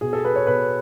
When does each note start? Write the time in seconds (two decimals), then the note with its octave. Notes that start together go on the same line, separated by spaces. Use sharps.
0.01 B2 G#4
0.13 A4
0.25 B4
0.36 C#5
0.47 B2 B4